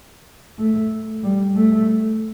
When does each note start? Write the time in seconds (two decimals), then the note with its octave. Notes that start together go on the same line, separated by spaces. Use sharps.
0.59 A3
1.23 G3
1.56 A3